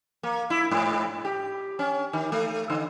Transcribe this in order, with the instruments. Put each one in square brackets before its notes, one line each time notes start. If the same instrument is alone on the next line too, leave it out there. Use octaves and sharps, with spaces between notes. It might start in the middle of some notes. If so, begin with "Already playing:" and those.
[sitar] A#3
E4
G#2
G4
C#4
D#3
A3
D3